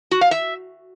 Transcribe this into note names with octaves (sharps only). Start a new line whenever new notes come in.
F#4
F5
E5